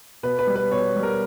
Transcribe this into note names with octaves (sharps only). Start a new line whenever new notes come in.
B2 B4
B4
G3
B4
B2 C#5
G3
A#4